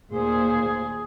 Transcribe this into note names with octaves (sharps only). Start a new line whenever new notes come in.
D#2 A#2 G#4 C5